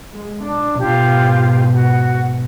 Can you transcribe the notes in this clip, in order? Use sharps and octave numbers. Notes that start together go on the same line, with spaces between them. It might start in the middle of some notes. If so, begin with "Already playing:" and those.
G#3
D4
G#2 B2 F4 G4 F5
F#4